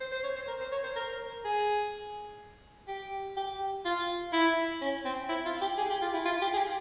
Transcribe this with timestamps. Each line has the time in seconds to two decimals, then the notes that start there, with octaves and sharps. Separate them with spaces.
0.01 C5
0.12 C5
0.24 C#5
0.36 C5
0.48 A#4
0.60 C5
0.72 C#5
0.84 C5
0.96 A#4
1.45 G#4
2.88 G4
3.37 G4
3.85 F4
4.33 E4
4.82 C#4
5.05 C4
5.29 E4
5.46 F4
5.62 G4
5.77 G#4
5.90 G4
6.02 F4
6.14 E4
6.26 F4
6.42 G4
6.54 G#4
6.58 G4